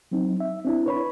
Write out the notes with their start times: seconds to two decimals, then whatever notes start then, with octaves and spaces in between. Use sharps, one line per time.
0.11 F#3 C4 D#4
0.40 E5
0.65 C4 D4 E4
0.86 B4 C#5 B5